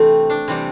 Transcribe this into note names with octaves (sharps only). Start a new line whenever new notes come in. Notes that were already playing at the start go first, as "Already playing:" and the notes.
Already playing: C3 E3 A3 C4 D4
D4
C3 E3 G3 C4